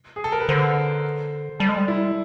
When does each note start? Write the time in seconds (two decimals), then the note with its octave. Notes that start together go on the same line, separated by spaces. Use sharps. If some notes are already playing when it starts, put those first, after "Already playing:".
0.16 G#4
0.24 A4
0.32 A#4
0.40 B4
0.49 D3 C5
1.60 G3 A4
1.69 G#3
1.77 G3
1.88 E4